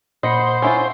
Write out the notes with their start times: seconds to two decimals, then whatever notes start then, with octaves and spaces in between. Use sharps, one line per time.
0.23 A#2 C5 D#5 F#5 B5 A#6 C#7
0.62 C#4 E4 F4